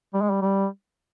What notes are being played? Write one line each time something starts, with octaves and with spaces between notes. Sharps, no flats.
G3
G#3
G3
G3